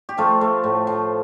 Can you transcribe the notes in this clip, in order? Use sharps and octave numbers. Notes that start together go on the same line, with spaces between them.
G4
F3 A3 F4
A3
A2
F3